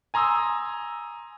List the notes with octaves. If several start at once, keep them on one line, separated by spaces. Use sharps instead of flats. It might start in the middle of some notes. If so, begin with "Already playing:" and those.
G#5 A#5 C6 D#6 E6